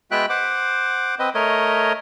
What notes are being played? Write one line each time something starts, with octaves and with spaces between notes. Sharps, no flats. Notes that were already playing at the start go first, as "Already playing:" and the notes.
G#3 B3 F#4 E5 G5 F#6
C5 F#5 D6
C4 B4 D#5
A3 A#4 C#5 D#5